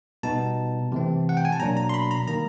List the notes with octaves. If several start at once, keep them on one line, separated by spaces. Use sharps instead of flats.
B2 G3 B3 D#4 A5
C3 E3 A3 C4
F#5
G5
G#5
A5
B2 F#3 A#3 D4 A#5
A#5
C6
B5
A#5
D#3 G3 A#3 A#5